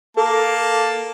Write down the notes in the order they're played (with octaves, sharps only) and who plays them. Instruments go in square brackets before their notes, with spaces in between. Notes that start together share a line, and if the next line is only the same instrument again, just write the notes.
[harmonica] A#3 A5 [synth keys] A4